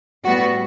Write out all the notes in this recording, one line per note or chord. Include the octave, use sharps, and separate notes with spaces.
A2 G3 B3 F#4